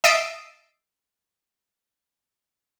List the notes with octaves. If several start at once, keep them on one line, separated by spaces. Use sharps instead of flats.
D#5 E5 E6 A6 C7 D7